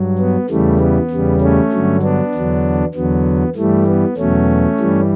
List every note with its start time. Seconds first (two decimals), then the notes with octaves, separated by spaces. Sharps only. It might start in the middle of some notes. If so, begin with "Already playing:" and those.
Already playing: G2 F#3
0.19 B3
0.50 E2 C#3 E3 G3 A3
0.80 B3
1.10 E2 C#3 G3
1.41 A3 C#4
1.72 G2 D3 F#3
2.02 B3 D4
2.34 E2 D3 F#3
2.95 E2 D3 F#3 B3
3.56 G2 E3 G3 A3
3.87 B3
4.18 E2 B2 F#3 A3 C#4
4.79 G2 E3 G3